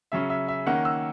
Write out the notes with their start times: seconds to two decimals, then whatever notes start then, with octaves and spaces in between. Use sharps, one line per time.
0.12 C#3 F#3 C#4 E5
0.30 E5
0.48 E5
0.66 D#3 A#3 C#4 F#5
0.85 E6